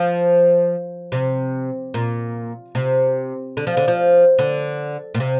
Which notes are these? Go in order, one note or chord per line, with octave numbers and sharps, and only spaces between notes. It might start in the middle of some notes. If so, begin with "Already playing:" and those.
Already playing: F3
C3
A#2
C3
D3
F3
D3
F3
D3
A#2
C3